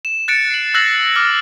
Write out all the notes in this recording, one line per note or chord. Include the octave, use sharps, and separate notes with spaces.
E7
F#6 A6 C#7 D7 E7
C7 F#7
E6 F#6 G#6 A#6 C7 F#7
D6 F6